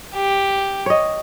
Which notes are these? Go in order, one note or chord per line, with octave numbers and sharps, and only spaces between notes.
G4
C#5 D#5